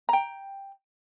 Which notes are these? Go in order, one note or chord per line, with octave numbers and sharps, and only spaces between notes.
G5 A#5